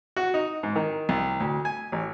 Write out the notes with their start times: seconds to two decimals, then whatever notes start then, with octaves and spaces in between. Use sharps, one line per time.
0.16 F#4
0.34 D#4
0.63 G#2
0.76 D#3
1.09 C2
1.40 D2
1.65 G#5
1.92 A1